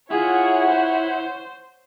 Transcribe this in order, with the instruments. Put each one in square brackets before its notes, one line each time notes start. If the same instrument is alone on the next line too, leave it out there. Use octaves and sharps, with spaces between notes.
[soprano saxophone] E4 [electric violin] F4 G#4 [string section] C#5 F#5
[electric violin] C5